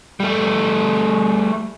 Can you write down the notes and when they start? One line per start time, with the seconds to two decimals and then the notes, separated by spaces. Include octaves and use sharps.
0.20 G3 A3